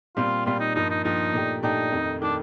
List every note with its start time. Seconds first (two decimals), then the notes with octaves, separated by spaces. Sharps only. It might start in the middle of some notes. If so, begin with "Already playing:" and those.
0.16 A#2 G3 C4 F4
0.46 A#2 G3 C4 F4
0.60 D#4
0.75 G2 F3 A#3 D#4
0.90 D#4
1.04 G2 F3 A#3 D#4
1.33 A#2 A3 D4 G4
1.63 A#2 A3 D4 D#4 G4
1.92 F2 D#3 A3
2.22 D#3 A3 D4